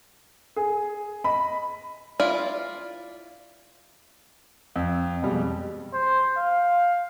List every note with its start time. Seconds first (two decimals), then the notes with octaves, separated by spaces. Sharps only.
0.56 G#4
1.24 D#5 B5
2.20 E4 F4 D5
4.76 F2
5.22 F2 B2 G3 G#3
5.93 C5
6.38 F5